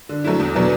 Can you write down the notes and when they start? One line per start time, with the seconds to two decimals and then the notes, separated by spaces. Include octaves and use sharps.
0.09 D3
0.24 F#3 A3 E4
0.40 E2
0.55 B2 F#3 B3 D4